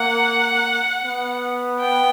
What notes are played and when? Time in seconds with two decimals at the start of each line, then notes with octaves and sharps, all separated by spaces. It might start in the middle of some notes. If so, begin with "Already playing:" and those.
Already playing: A#3 F#5
1.05 B3
1.80 G5